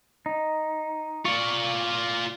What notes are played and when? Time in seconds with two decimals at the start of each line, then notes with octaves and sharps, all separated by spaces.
0.26 D#4
1.25 F4 D5 C#6